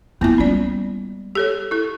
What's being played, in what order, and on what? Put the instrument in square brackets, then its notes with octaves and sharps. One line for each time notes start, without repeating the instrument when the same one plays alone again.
[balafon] A#3 B3 [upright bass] E4 F4
[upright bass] G3 G#3 [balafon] C#4 D5
[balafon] G4 A4 C#5
E4 A4